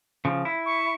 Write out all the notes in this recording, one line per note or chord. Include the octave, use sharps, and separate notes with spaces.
C#3 F3
E4
C#6